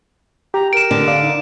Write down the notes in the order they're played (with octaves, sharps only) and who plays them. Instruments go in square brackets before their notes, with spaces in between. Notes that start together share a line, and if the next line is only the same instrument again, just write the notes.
[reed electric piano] G4 [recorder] A#5
[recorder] A#4 [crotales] D7 E7
[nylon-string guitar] D3
[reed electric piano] D5 F5
[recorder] D#4